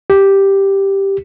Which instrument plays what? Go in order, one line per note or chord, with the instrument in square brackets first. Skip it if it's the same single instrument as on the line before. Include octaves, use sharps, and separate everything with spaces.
[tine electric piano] G4